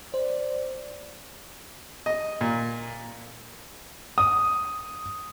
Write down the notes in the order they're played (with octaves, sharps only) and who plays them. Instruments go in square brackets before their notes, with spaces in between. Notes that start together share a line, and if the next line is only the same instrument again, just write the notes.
[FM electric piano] C5 [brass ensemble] D5
[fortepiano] D#5
A#2
[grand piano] D#6